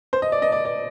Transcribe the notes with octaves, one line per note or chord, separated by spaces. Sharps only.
C5
D#5
D5
D#5
D5
D5